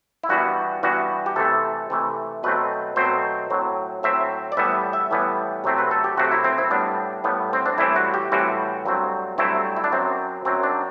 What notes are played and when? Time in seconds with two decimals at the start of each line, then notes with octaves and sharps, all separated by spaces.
0.23 E4
0.29 G2 E3 G3 B3 F#4
0.83 G2 E3 G3 B3 F#4
1.26 G4
1.36 C3 E3 A3 A4
1.90 C3 E3 A3
2.43 B2 F#3 A3 C4 B4
2.96 B2 F#3 A3 C4 C5
3.50 A2 F#3 C4
4.03 A2 F#3 C4 E5
4.52 D5
4.57 A2 E3 G3 B3 E5
4.93 E5
5.11 A2 E3 G3 B3
5.64 C3 F#3 A3 C4
5.78 B4
5.91 A4
6.04 G4
6.17 C3 F#3 A3 C4 F#4
6.32 E4
6.44 C4
6.58 E4
6.71 A2 G3 B3 D4
7.24 A2 G3 B3
7.53 C4
7.66 D4
7.78 A2 E3 G3 C4 E4
7.96 F#4
8.14 G4
8.32 A2 E3 G3 C4 F#4
8.85 G2 F#3 A3 C4
9.38 G2 F#3 A3 C4 E4
9.77 E4
9.84 D4
9.92 F#2 F#3 C4
10.45 F#2 F#3 C4
10.63 D4